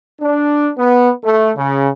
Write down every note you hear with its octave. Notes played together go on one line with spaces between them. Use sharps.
D4
B3
A3
C#3